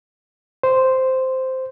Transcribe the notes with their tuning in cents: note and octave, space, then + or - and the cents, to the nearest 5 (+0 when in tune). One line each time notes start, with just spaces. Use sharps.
C5 -5